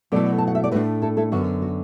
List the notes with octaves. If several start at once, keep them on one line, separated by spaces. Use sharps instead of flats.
B2 F#3 A3 E4 A4 D5
A5
F#5
E5
D5
A2 A3 D4 F#4 B4
E4 A4
E4 A4
F#2 D3 B3 F#4
F#4